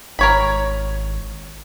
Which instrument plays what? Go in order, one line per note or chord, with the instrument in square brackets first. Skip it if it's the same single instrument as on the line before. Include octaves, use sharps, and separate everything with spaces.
[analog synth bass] G#1 [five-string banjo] A#4 C#5 B5